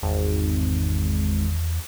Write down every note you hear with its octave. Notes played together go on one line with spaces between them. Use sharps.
G#1 E2